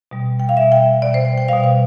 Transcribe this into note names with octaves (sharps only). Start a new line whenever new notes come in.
B2 G3
G5
F5
B2 G3 E5
G5
B2 G3 D5
C5
G5
G5
B2 G3 F5
F5